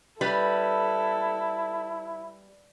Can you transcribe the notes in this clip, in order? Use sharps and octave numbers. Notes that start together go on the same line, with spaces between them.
G3 E4 A4 B4